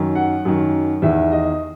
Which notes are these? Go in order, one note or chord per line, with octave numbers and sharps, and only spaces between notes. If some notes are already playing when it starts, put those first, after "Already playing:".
Already playing: F#2 D#3
F#5
F#2 D#3
E2 D#3 E5
D#5